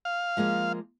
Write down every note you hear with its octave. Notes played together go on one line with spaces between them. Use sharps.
F5
F3 G#3 A#3